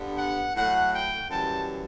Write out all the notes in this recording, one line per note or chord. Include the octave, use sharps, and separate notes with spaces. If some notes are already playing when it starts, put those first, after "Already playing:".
Already playing: G2 D3 G3 B3
F#5
A2 F#3 A3 F#5
G5
F#2 E3 G3 A5